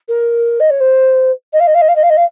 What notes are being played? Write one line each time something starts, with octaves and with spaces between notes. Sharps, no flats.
A#4
D#5
C#5
C5
D#5
F5
D#5
F5
D#5
F5
D#5
F5
D#5
F5